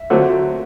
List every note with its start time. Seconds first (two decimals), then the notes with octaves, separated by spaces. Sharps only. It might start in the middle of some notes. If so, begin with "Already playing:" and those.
Already playing: E5
0.10 D3 F#3 A3 C4 F4